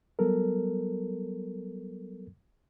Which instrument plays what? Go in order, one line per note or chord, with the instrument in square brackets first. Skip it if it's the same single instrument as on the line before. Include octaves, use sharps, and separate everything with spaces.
[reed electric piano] F#3 G3 B3 A4 A#4